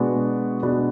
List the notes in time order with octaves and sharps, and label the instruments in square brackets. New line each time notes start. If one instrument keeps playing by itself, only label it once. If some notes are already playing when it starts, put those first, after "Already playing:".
Already playing: [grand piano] B2 G#3 B3 D4 F#4
B2 G#3 B3 D4 F#4